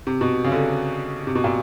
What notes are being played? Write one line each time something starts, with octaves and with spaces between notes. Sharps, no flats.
C3
B2
C#3
D3
C3
B2
A#2